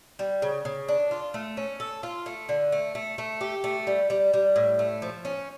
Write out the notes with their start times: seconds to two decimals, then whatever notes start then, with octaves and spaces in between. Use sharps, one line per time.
0.19 G3
0.42 C#3
0.65 C#3
0.89 D4
1.11 F4
1.34 A3
1.57 C#4
1.80 A4
2.03 F4
2.26 A3
2.49 D3
2.72 A3
2.95 A3
3.18 A3
3.41 G4
3.64 A3
3.87 G3
4.10 G3
4.34 G3
4.56 A2
4.79 A3
5.02 F3
5.25 C#4